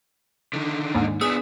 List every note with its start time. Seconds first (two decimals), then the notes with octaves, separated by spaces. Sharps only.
0.53 D3 D#3
0.95 D#2 G#2
1.21 B3 D4 G#4 E6